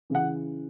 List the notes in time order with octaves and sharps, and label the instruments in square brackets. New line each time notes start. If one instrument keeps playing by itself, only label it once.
[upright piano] C#3 E3 F#5